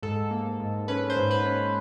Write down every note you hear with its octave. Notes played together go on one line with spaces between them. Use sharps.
G#2 A4
A#3
G#2
C#4 B4
C5
G#2
B4
C#4